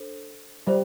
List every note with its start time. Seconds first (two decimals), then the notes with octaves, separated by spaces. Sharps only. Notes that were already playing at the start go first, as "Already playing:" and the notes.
Already playing: D4 A4 C5
0.67 G3 F4 C5